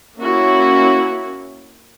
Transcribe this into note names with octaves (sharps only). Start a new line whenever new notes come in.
A#3 C#4 E4 F#4